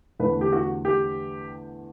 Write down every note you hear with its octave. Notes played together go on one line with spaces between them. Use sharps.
E2 D3 A3 B4
G4
F#4
G4